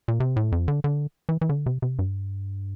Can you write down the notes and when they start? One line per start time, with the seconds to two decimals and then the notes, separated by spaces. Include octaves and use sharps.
0.08 A#2
0.20 C3
0.36 A2
0.52 F2
0.68 D3
0.84 D3
1.29 E3
1.41 E3
1.49 D3
1.66 C3
1.82 C3
1.99 G2